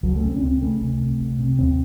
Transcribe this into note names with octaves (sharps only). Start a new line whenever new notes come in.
C#2 F#3
A3
C#3
C4
C#4
C#2 C4
C#3 A3
C2
C3
C2
C3
D#2 C4